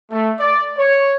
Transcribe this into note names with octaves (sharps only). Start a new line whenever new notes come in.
A3
D5
C#5